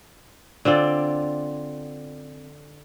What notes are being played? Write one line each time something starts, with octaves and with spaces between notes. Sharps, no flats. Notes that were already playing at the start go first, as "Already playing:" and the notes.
D3 C4 F4 D5